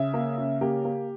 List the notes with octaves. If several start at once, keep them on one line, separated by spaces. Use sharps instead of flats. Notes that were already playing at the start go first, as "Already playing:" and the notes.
Already playing: C#3 E5
A#3
C#3
A#3 G4
A#3